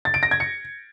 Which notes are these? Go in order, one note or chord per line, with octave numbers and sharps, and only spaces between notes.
A6
D7
A#6
G#6
C#7